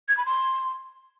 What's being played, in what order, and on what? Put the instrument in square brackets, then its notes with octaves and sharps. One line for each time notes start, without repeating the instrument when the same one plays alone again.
[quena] G#6
B5
C6